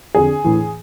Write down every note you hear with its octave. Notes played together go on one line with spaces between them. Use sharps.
F2 D3 G#4
A2 E3